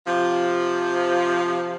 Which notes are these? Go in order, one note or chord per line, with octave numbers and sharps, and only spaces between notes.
C3 F3